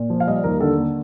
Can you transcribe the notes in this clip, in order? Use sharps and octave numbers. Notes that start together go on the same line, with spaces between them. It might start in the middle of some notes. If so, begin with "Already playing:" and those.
Already playing: A#2
F3
F5
G3 D#5
D#2 A#4
D3 A4
A#3